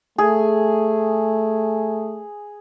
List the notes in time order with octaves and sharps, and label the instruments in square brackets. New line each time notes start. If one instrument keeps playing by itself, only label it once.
[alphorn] A3 [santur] G#4